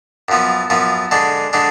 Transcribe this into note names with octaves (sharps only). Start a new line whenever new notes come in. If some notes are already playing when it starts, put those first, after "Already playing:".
F#2 F3 B3
F#2 F3 B3
D3 G#3 D4
D3 G#3 D4